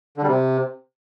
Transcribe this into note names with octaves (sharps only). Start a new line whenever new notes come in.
D3
G3
C3